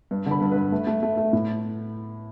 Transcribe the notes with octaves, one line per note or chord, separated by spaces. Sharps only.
G2
D3 B5
G2
G2 B4
A3
A3
A3
A3
A2